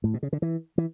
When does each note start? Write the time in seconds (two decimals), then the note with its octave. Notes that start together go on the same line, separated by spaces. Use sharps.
0.04 A2
0.14 B2
0.23 C#3
0.33 D3
0.42 E3
0.78 E3